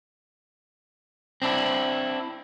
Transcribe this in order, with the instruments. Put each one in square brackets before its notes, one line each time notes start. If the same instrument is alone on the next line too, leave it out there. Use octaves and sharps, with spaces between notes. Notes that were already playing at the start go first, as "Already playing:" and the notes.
[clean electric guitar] C4 D4 E4